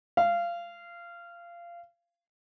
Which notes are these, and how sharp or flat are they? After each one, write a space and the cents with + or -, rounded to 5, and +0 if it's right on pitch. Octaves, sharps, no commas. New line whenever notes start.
F5 -20